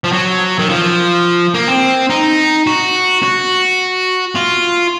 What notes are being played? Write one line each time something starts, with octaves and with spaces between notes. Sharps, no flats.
F3
F#3
D#3
F3
A#3
C4
D#4
F#4
F#4
F4